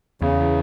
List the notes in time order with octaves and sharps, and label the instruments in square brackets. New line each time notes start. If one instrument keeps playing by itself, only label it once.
[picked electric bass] E2 [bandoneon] C#3